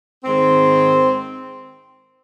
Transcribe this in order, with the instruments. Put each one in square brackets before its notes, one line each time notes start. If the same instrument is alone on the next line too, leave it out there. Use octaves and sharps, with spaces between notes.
[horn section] G#2 D#3 G#3 C4